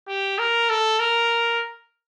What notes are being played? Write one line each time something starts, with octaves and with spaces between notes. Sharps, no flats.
G4
A#4
A4
A#4